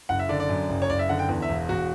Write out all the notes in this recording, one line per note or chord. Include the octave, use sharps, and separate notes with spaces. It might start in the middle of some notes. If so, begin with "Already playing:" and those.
F#1 F#5
E5
D3 D5
D5
F#2
F#1
C#5
F#1 D5
E5
D3 F#5
G5
E2
E5
E1
E1 F#4